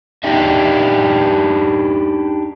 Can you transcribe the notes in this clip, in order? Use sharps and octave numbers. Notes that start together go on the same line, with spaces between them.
D4 D#4 G4 D#5 E5